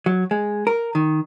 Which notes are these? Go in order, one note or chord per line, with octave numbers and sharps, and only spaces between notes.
F#3
G#3
A#4
D#3